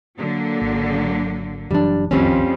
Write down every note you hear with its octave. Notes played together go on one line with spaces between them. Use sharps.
D3 F#3 A#3
G#1
F#1 E3 F#3 G3 D4
F#1 C2 F2 D#3 F3 G3 C4 C#4